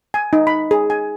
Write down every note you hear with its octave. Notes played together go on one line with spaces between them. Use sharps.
G#5
D#4
B5
G#4
G#5